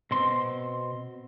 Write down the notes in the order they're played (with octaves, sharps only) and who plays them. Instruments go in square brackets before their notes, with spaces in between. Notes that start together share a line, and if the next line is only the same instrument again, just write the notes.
[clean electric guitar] B2 C4 C6